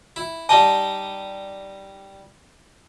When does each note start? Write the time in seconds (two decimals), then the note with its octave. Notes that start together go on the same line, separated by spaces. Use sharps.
0.16 E4
0.49 G3 D#4 D#5 A5